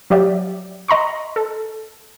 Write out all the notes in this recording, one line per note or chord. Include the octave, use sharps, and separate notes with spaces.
F#3 G4 D5 E5
D#5 A#5 C6 C#6
A4